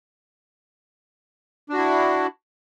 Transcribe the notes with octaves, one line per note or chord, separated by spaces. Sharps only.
D4 E4 F#4